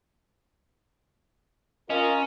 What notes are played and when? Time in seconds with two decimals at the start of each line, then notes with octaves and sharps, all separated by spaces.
1.90 C#4 F4 A#4 D#5